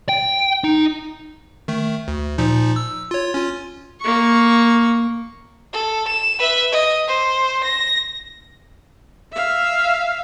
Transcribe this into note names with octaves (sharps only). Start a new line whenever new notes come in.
G5
D#4
D#3 A3
D2
A#2 F3 D#4
E6
F4 C#5
C#4 F4
A#3 C#6
A4
E7
B4 E5
D#5
C5
A#6
E5 F5